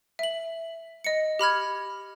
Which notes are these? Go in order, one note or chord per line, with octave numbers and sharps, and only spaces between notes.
E5 F#7
D#5 C#7
G4 B5 F6 G#6